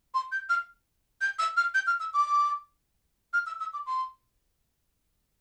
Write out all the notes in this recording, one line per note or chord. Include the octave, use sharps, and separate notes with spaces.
C6
G6
F6
G6
E6
F6
G6
F6
E6
D6
F6
E6
E6
D6
C6